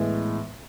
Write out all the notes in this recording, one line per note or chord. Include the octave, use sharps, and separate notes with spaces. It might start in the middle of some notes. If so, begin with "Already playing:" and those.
Already playing: A2 E3 G#3 B3